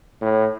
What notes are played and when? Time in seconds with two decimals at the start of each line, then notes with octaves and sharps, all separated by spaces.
0.21 A2